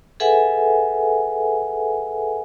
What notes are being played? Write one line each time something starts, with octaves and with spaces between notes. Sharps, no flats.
G#4 A4 B4 E5 F#5 G#5